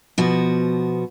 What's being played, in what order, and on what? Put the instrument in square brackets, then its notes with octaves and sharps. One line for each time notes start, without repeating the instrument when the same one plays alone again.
[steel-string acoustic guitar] B2 F3 F#4